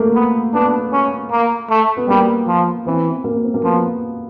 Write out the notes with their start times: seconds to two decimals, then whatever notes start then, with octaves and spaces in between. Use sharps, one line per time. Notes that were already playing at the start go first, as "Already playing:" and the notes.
Already playing: A3 A#3
0.15 B3
0.54 B3 D4
0.92 C#4
1.31 A#3
1.70 A3
1.97 B3
2.08 G3 A#3
2.48 F3
2.86 E3 C4
3.06 B3
3.24 A#3
3.44 C4
3.54 A#3
3.64 F3 B3